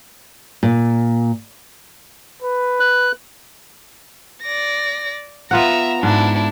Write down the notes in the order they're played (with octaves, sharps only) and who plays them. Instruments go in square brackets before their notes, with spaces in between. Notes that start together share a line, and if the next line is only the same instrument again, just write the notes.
[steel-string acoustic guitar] A#2
[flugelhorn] B4
[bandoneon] F#6
[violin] D5 A#6
[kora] B3 F4 F#5 [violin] E5 A#5
[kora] G#2 [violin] D4 E4